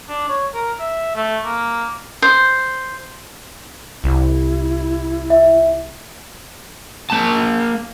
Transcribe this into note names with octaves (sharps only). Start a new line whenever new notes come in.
D4
C#5
A#4
E5
A3
A#3
C5
C2 E4
E5
A#3 A5